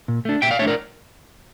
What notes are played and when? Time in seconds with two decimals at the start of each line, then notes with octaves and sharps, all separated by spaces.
0.08 A#2
0.25 A3 D4
0.42 A#2 E5 G5
0.51 D5 F5
0.59 A3 D4 C#5 E5
0.68 A#4 D5